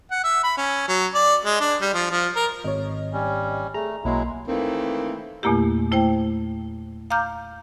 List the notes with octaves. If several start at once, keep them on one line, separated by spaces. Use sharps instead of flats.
F#5
E5
B5
C#4
F#3
D5
G#3
D4
G3
F3
F3
A#4
G#1 C#5 D#5
G3 C#4
A3 G#4 A#5
B1 F#3 G#3 A#3 E4 C6
D#3 E3 A3 A#3 C4
E2 A#2 A3 A#3 E4 G4
A3 E4 C5 G5
F5 A#5 D6 F6 G6